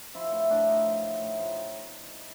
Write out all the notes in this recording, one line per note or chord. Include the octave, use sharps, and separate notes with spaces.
F3 E4
A2 E4
A2 D4
F3 D#4
F3
A2
A2
F3